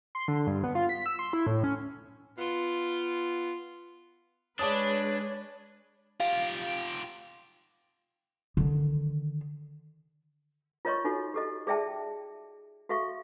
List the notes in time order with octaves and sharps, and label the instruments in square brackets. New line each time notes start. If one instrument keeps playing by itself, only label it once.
[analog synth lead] C6
D3
G2
B3
F4
B6
E6
C6
E4
A2
C#4
[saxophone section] B3 F4
[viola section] G#3 B4 [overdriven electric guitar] D4 [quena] C#5 [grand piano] D5 A5 D#6
[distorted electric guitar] F4 G4 [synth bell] F5
[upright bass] D3 D#3
[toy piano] F4 A#4 C#5 D#5 C6 C#6
D#4 F4 F#4 A4
G4 A4 D#5
G#4 D5 E5 G5 A5
F#4 A4 E5 F5 C#6